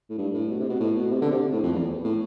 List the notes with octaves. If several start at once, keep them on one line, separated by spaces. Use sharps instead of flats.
A2
G2
A2
B2
C3
B2
A2
B2
C3
D3
C3
A2
F2
E2
A2